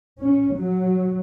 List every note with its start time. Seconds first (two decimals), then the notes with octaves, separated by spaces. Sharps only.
0.20 C#4
0.55 F#3